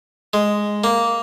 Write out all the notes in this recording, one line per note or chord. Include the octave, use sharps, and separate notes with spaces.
G#3
A#3